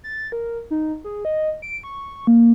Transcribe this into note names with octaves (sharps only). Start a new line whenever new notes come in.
A6
A#4
D#4
G#4
D#5
D7
C#6
A#3